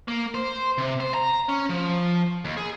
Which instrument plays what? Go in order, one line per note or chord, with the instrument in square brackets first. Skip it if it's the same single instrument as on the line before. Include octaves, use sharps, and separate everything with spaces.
[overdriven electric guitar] A#3
C5
C3
C5
A#5
C#4
F3
D#2
G#4